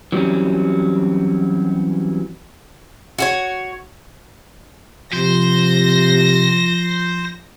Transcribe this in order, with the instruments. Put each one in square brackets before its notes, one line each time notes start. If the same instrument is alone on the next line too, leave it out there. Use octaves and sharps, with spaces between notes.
[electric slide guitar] E3 F#3 G3 C4 C#4
[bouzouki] F#4 G4 C#5
[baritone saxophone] C3 [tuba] F3 [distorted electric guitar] C5 [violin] A#6